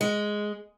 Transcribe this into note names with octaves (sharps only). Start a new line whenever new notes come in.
G#3